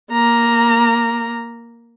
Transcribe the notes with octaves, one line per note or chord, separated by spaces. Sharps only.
A#3 A#5